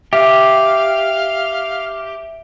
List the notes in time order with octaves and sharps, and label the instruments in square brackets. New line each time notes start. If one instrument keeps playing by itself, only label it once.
[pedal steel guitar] G4 [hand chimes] E5 [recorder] F5